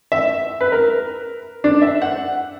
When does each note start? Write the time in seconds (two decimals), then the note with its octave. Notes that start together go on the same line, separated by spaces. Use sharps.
0.12 E5
0.61 B4
0.72 A#4
1.64 D4
1.82 E5
2.02 F#5